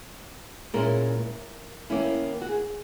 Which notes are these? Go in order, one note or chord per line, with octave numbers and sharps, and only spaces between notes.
A#2 G#3 C#4 E4 A#4
D#3 A#3 C#4 E4
F#4
G#4